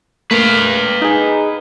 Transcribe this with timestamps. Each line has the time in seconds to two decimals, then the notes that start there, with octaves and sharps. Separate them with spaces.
0.31 A3 A#3 B4 F5
1.02 D#4 G#4